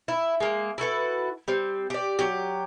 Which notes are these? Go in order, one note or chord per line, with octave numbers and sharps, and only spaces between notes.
E4
G#3 A#3
E4 F#4 A4 B4
G3 C4
G4 D5
F#3 G4